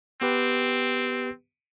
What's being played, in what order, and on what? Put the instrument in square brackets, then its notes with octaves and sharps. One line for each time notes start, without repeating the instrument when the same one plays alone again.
[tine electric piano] B3 G4 B4 [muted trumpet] C4